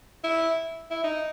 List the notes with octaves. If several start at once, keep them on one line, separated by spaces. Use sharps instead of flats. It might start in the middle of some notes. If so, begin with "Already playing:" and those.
E4
E4
D#4